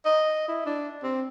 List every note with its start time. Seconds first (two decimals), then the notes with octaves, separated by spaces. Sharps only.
0.06 D#5
0.48 E4
0.66 D4
1.03 C4